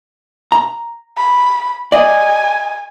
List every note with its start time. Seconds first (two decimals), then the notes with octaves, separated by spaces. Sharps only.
0.52 A#5
1.18 B5
1.92 D5 D#5 G#5